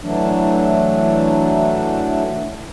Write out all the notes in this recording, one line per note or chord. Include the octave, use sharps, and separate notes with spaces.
E3 F#3 A3 D4